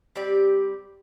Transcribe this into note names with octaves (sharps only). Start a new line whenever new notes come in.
G3 C4 G4 D5